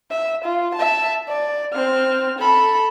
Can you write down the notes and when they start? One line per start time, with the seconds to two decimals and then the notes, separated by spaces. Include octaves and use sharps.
0.11 E5
0.44 F4
0.75 E5 A5
1.28 D5
1.73 C4 F6
2.39 A4 B5